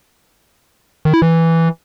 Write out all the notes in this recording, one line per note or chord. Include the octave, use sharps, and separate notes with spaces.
D#3
E4
E3